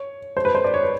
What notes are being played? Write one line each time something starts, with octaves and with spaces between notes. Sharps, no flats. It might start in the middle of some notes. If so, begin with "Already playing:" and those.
Already playing: C#5
C5
B4
C5
D5
C#5
B4